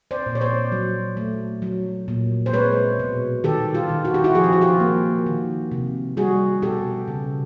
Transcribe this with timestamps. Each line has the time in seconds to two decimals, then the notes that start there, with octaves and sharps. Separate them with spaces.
0.11 C5 D5
0.26 A#2
0.35 C#5
0.41 C5 D5
0.72 F#3
1.17 A3
1.62 F#3
2.08 A#2
2.46 C5
2.53 G#3 B4 C#5
2.99 B2
3.44 D#3 G4 A4
3.74 F4 G4
3.89 D#3
4.05 F#4
4.14 G4
4.24 E4 F#4
4.35 F3 G#4
4.44 G4
4.53 F#4
4.61 F4 G4
4.80 A#3
5.26 D#3
5.72 C3
6.17 G3 F#4 G#4
6.62 B2 G4 A4
7.08 C#3